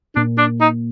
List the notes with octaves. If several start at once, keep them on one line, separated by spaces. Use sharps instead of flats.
A#2 D4
D4
D#4